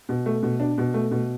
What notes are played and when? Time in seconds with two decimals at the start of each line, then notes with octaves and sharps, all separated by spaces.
0.09 B2
0.26 A3
0.43 B2
0.60 D4
0.78 B2
0.94 A3
1.11 B2